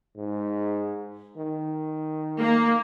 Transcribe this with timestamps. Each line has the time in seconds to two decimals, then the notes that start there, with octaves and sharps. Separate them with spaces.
0.16 G#2
1.37 D#3
2.41 A#3